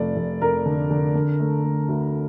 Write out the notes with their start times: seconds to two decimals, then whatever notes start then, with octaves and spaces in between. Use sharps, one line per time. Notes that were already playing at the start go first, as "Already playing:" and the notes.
Already playing: F1 A3 D5
0.16 F1
0.42 F1 A#4
0.65 D3
0.91 D3
1.15 D3
1.40 A3
1.64 A3
1.89 D2